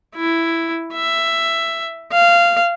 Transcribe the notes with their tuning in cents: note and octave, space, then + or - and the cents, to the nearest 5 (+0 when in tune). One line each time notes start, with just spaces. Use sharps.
E4 +5
E5 +10
F5 -15